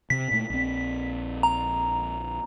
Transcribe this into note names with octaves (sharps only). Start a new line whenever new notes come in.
C3 C4 B6
A#2 A3
A#1 C4
A#5